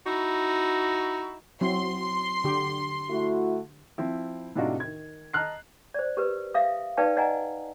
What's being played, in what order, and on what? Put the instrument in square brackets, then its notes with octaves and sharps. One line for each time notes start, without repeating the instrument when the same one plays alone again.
[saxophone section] D#4 E4 F#4
[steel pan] F#3 C4 E4 [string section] C6
[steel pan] D3 G4
[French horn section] A3 E4 F#4
[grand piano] F3 C4 E4
A2 C3 D4 D#4 F4 F#4
D#3 G#6
D#5 A5 A#5 F6 F#6 C7
[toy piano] C5 D5
G4 A#4 B4
E5 F5 D#6
D#4 B4 D5 F5 G5 A5
D5 D#5 F#5 G#5 A#5